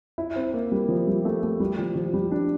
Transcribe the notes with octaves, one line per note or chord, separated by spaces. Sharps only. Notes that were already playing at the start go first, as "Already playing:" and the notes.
E4
C4
A#3
G3
F3
G3
A3
A3
G3
F3
F3
G3
D4